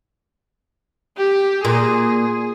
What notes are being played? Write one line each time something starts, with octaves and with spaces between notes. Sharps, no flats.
G4
A#2 G#4